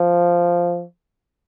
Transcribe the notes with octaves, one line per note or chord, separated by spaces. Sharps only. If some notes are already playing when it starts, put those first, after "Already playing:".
Already playing: F3